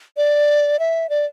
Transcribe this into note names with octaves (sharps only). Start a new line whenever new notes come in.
D5
E5
D5